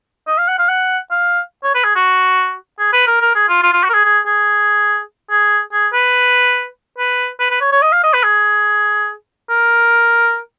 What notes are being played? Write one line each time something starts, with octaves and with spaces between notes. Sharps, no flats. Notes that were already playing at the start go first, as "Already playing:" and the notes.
D#5
F5
F#5
F5
F#5
F5
C#5
B4
G#4
F#4
G#4
B4
A#4
A#4
G#4
F4
F4
F4
F#4
A#4
G#4
G#4
G#4
G#4
G#4
B4
B4
B4
B4
C#5
C#5
D#5
F5
D#5
B4
G#4
A#4